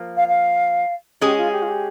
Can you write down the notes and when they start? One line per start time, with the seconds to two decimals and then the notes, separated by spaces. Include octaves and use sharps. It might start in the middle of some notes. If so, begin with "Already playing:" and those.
Already playing: F3 A#3
0.17 F5
0.28 F5
1.21 G#3 C#4 G4 G#4
1.37 F4
1.53 G4
1.62 F4
1.69 G4